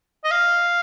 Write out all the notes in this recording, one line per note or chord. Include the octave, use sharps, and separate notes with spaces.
D#5
F5